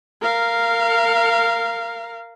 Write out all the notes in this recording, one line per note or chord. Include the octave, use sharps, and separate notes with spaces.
A#4 F5